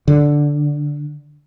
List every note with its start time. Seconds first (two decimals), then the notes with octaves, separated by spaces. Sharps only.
0.08 D3